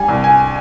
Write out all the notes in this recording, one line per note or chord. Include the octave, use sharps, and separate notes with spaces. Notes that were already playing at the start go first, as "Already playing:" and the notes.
Already playing: G3 G#5
C2
G#5